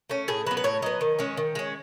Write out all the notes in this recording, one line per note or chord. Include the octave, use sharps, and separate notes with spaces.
A3 C#4
A2 G#4
F#3 B3 B4
B4
A2 C#5
F#3 B3 D#5
D#3
G#3 C#4
D#3
G#3 C#4